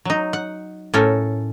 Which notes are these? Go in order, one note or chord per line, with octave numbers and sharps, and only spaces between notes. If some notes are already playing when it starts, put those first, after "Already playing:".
F#3 D#4
F#5
A2 C#4 A4 A#4